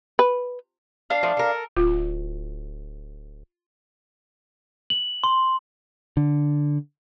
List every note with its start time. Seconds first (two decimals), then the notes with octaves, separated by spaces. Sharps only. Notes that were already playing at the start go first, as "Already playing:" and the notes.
0.19 B4
1.10 D4 F5
1.23 F3 A3
1.37 A4 A#4
1.77 D1 F4
4.90 F#7
5.24 C6
6.17 D3